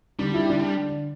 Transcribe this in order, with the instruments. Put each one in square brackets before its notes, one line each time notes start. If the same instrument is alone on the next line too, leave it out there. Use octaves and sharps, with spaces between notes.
[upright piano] D3 [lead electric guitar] G3
[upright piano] E4
D3